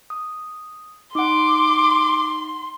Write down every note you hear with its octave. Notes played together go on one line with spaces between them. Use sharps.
D#6
D#4 F#5 C6 D6